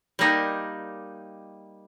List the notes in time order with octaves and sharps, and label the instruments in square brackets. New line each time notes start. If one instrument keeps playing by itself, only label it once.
[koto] G3 A#3 D#4 G4